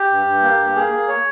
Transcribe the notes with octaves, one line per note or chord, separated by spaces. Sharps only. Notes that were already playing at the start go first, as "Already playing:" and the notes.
Already playing: G4
G2
G2
A#3
G2
A#3 G#4
A#3
C#5